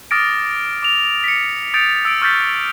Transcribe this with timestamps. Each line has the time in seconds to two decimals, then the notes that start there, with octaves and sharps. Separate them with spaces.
0.11 D6 D#6 F6 A6 A#6 D7
0.83 D6 F7
1.24 B6 C#7
1.74 D#6 G6 A6 C#7 D7 F7
2.05 E6 D7
2.21 C#6 F6 G6 A6 B6